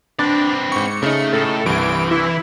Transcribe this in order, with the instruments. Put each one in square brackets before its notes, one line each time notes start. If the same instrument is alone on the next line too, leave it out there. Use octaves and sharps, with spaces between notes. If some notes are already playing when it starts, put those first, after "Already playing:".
[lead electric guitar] C4 B4 [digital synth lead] D4 [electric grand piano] A6
[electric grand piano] G#2 C#6 [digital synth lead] C#7
[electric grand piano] C#3 D#4 [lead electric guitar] A3
[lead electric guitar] A2 [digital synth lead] A4
[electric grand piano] C2 G2 [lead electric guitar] E3 [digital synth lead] D7
[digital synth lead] E4